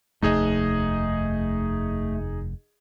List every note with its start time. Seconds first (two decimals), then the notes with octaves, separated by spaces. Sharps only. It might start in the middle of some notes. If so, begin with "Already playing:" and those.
0.22 F1 D#2 A3 D#4 G#4 D#5